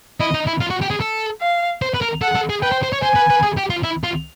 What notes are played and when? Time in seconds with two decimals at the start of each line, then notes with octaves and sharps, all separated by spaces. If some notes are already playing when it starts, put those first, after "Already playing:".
0.20 E4 D#5
0.34 D#4
0.47 E4
0.60 F4
0.70 F#4
0.82 G4
0.90 G#4
1.01 A4
1.41 F5
1.82 C5
1.94 B4
2.01 A#4
2.22 A4 F#5
2.35 A4
2.50 G#4
2.62 B4 G5
2.72 C5
2.83 C5
2.93 C#5
3.03 C5 G#5
3.16 B4
3.30 B4
3.43 G#4
3.57 G4
3.70 F4
3.83 E4
4.04 F4